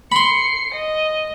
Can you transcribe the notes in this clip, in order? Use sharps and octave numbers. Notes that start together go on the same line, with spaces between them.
B5 C6 C7 C#7
D#5